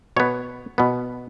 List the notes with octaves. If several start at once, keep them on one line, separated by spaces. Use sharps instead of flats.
B2 B3 C#5
B2 B3